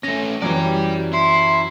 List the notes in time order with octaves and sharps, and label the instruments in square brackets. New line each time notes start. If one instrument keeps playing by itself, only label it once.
[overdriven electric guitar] A3 C#4 [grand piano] A#6
[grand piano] F#2 E3 F#3 [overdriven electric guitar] G4 D5
[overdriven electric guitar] E4 [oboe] C6